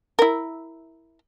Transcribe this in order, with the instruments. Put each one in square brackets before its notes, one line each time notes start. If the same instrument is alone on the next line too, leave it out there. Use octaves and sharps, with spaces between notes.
[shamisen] E4 A#4